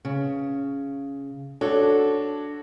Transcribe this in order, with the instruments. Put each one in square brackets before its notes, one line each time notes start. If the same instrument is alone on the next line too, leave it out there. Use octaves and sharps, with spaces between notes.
[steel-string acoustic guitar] C#3
[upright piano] D4 F#4 C#5 [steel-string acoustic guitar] A4